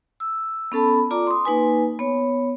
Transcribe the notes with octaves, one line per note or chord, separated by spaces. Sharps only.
E6
B3 C#4 A4 A5 B5
F4 D5 A#5 D6
C6 D#6
A#3 D#4 B4 G#5
B3 C#5